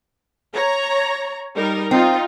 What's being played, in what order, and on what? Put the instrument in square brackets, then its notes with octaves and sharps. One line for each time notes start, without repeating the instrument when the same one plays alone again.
[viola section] C#5 A#5
G3 D#4 A#4
[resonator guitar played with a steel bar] C4 [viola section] D#4 F4